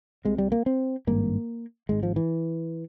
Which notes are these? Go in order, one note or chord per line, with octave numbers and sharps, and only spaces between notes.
C2 C3 G#3
G3
A#3
C4
G#1 G2 A#3
G#1 G#2 G#3
F3
E3